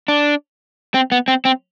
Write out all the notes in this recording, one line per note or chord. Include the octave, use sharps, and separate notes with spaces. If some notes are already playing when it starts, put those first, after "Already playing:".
D4
C4
B3
C4
C4